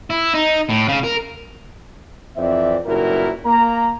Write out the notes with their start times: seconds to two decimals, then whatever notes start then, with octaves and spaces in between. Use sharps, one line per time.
0.10 E4
0.33 D#4
0.69 A2
0.88 C#3
1.04 A#4
2.37 F2 E3 C4 C5 D5 E5
2.85 F#1 G2 A#2 E4 F#4 A#4
3.45 A#3 A#5